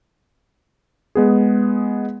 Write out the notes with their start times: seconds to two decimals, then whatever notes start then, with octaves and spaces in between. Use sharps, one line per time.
1.15 G#3 B3 G#4